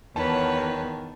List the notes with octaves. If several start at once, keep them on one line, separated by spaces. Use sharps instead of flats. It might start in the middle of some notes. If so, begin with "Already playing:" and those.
E2 D#3 B4 C#5 A5